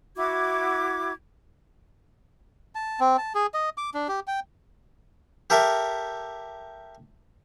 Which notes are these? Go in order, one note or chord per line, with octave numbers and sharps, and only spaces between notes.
E4 F#4 D6 G#6
A5
C4
A5
G#4
D#5
D6
D4
G4
G5
G4 A4 A#4 E5